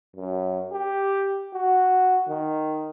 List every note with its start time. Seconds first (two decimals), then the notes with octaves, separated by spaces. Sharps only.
0.16 F#2
0.72 G4
1.54 F#4
2.29 D#3